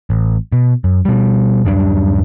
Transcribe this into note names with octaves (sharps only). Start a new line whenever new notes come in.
A1
B2
F#2
B2 G3
D1 F#2 G3 D4